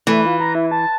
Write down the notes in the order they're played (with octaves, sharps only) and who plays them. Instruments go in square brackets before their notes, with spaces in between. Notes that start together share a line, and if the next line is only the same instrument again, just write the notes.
[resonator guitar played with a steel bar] E3 [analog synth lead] A3
[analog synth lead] F4
A#5
E4
A5